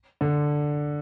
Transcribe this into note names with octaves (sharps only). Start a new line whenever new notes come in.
D3